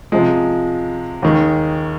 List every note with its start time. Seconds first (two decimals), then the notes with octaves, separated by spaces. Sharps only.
0.12 C3 F3 G#3
1.22 D#2 D#3 G#3